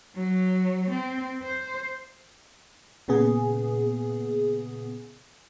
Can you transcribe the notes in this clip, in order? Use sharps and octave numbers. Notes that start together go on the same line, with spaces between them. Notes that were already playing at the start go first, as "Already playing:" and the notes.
F#3
C4
C5
A#2 C#3 B3 G#4